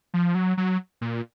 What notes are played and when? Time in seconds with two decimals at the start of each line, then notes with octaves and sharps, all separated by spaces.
0.14 F3
0.35 F#3
0.57 F#3
1.01 A#2